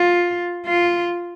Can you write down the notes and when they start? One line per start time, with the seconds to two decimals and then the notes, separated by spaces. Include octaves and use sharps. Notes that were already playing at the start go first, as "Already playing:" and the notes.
Already playing: F4
0.66 F4